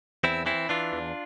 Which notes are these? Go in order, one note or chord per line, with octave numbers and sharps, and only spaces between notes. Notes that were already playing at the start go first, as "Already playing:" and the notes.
E2 C4 E4
E3 C4 E4
E3 D4 F4
E2